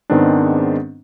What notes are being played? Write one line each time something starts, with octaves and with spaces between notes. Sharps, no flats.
G#2 D#3 G#3 B3 C4 D4